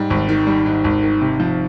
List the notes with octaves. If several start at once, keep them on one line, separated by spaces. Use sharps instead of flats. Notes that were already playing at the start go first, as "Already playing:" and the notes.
Already playing: G#2 G3
G#1
D#3
G3
G#2
G#1
D#3
C3
F3